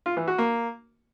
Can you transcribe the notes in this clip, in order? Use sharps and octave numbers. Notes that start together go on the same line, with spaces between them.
F4
E3
F#4
A#3